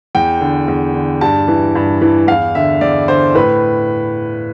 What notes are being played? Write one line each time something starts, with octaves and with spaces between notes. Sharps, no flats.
E2 G5
D3
E2
D3
G2 A5
E3
G2
E3
E2 F5
D3 E5
E2 D5
D3 C5
A2 B4